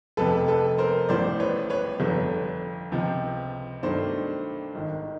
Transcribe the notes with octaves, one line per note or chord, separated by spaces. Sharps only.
F1 F2 C3 A4 B4
A4 B4
A#4 C5
A1 A2 F3 C5 D5
B4 C#5
B4 C#5
G1 F2 D3
C#2 C3 F3
G2 D#3 F#3 A3 C5 D5
G#1 G#2 D#3